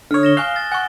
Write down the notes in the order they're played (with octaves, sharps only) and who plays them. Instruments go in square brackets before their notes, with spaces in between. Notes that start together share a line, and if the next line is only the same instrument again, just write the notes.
[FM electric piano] D3 C#5 [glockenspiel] D#6 F6
[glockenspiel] A#6 E7 G7
[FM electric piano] F5 [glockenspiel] G#5 C#6 F#6
[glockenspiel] A6
[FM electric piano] F#5 [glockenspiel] G#5 C#6